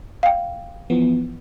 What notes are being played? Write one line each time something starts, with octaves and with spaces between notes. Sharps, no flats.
F5 G5
E3 F3 B3